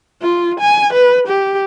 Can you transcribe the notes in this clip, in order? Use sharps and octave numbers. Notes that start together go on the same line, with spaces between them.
F4
G#5
B4
G4